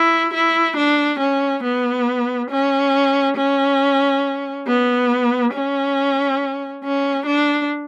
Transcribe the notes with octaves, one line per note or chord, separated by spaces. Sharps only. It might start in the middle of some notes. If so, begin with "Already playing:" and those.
Already playing: E4
E4
D4
C#4
B3
C#4
C#4
B3
C#4
C#4
D4